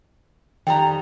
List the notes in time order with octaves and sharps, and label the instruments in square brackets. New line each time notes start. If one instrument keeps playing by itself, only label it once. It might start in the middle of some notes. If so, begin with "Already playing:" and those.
[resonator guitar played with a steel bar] F2 G3 A#5 [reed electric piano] D#3 [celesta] G5